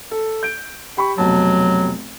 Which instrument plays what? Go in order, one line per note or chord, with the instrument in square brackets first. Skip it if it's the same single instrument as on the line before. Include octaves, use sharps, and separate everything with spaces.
[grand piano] A4
G6 D7
G4 B5 C#6
[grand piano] F1 B2 A5 [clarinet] F#3